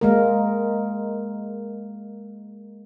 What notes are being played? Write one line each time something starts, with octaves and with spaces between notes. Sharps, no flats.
G#3 A#3 A#4